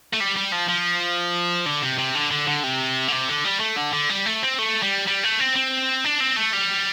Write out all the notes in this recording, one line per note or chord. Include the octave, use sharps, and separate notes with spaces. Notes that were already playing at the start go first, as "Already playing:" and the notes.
A3
G3
G3
F3
F3
D3
C3
C3
D3
D3
D3
C3
D3
C3
D3
G3
A3
D3
D3
G3
A3
C4
A3
G3
G3
A3
C4
C4
D4
C4
A3
G3